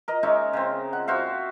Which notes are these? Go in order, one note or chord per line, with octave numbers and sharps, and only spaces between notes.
A#4 D#5
G#3 C#4 D#4 E5
C#3 C4
F#5
F#4 C5 E5 F5